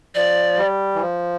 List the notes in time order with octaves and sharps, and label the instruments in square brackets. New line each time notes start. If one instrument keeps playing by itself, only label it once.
[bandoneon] F3 [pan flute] D5
[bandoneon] G3
E3
F3